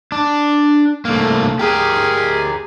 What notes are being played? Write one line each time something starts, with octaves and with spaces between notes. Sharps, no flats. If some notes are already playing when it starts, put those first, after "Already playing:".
D4
C2 A3 A#3
G4 G#4 A#4